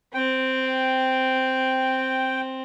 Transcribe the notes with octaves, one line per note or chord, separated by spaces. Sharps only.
C4 G5